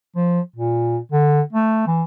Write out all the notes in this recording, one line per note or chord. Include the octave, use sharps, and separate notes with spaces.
F3
A#2
D3
A3
E3